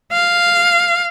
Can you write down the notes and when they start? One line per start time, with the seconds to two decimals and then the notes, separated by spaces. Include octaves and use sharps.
0.12 F5